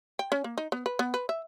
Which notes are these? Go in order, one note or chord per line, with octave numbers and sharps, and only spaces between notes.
G5
C#4
A#3
D#4
B3
B4
B3
B4
E5